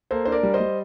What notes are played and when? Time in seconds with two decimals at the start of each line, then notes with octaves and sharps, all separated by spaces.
0.11 A#3 A4 C5
0.25 D4 C5
0.32 A#4 D5
0.43 G3
0.54 C5 D#5
0.60 G3